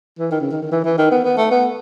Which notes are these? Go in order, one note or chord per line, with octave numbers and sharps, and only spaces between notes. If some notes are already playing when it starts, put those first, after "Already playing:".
E3
D#3
C#3
D#3
D#3
E3
E3
D#3
B3
B3
A3
B3